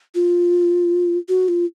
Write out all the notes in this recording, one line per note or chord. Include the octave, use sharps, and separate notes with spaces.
F4
F#4
F4